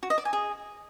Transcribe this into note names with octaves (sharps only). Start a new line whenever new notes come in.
F#4
D#5
D5
G#5
G#4